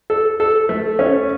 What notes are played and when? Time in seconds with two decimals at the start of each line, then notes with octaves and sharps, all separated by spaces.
0.10 A4
0.40 A4
0.69 A3
0.99 C#4